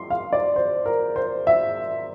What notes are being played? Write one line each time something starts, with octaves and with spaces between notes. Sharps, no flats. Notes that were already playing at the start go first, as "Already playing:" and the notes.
Already playing: C6
F5
D5
C5
A#4
C5
E5